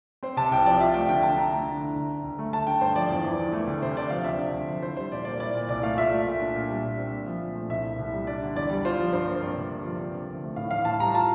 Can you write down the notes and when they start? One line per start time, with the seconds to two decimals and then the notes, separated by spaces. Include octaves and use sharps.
0.23 C4 C5
0.37 C3 A5
0.51 C2 G5
0.65 F3 D5
0.80 F4 E5
0.94 A3 G5
1.09 D3 G5
1.23 D4 A5
1.37 D3 A#5
1.53 A3
1.67 D3
1.81 E4
1.96 D2
2.10 D3
2.24 D2
2.39 A3
2.53 A3 A5
2.67 D3 G5
2.81 G2 C5
2.95 F3 D5
3.10 E2
3.24 E3
3.39 E2
3.53 A3
3.67 D2
3.82 C3 C5
3.96 D2 D5
4.10 F3 F5
4.24 C4 E5
4.39 D3
4.54 D2
4.68 F3
4.82 E4 C5
4.97 G3 C5
5.11 A#2 D5
5.25 A#3 D5
5.40 E4 D5
5.54 A#2
5.69 C2 D5
5.83 A3 F5
5.97 F4 E5
6.11 A3
6.27 A#2
6.40 D4
6.55 A#2
6.69 G3
6.84 A#2
6.98 C4
7.12 A#2
7.26 F3
7.42 A#2
7.55 A3
7.70 C2 E5
7.83 A#2
7.99 C2
8.13 G3
8.27 D4 D5
8.42 D3
8.55 E2 D5
8.70 G3
8.85 F4 C5
8.99 F3
9.13 G2 C5
9.28 A#3
9.42 C4 D5
9.56 C3
9.71 D2
9.85 F3
9.99 C4
10.14 D3
10.28 D2
10.43 A3
10.56 A2 F5
10.71 E3 F5
10.85 A2 A5
10.99 G3 A#5
11.14 F4 A5